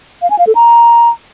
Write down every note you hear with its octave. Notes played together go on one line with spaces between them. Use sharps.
F5
G#5
F5
A4
A#5